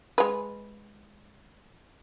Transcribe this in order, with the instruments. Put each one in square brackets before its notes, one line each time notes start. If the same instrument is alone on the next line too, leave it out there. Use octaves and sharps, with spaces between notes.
[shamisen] G#3 B4